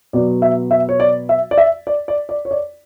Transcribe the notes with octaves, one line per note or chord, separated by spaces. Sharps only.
B2 F#3 B3 D5
E5
E5
C#5
D5
E5
D5
E5
D5
D5
D5
C#5
D5